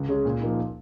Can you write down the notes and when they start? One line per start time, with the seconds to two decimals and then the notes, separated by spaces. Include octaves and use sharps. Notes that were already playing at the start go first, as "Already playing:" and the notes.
Already playing: C#2
0.08 C#3 G#3 C#4 G#4
0.25 A#2
0.41 F3 A#3 D#4